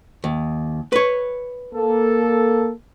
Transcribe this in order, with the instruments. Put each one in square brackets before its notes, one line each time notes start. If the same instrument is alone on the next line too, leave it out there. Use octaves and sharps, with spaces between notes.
[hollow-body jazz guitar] D#2
B4 C#5
[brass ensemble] A#3 A4